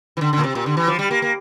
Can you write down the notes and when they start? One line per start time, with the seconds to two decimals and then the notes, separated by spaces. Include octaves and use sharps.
0.17 E3
0.21 D3
0.33 D3
0.38 A#2
0.44 C3
0.55 A#2
0.66 D3
0.77 E3
0.88 F3
0.99 G3
1.11 A#3
1.22 A#3